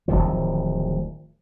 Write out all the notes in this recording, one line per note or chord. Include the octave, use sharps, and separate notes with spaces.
D1 E2 D#3 F3